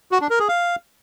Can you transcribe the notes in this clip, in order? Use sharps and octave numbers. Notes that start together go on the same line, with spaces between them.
F#4
D4
A#4
G#4
F5